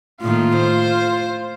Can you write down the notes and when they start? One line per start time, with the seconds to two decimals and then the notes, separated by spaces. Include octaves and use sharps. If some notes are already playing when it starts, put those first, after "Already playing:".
0.22 A2 D#3 A#3 F4
0.56 C5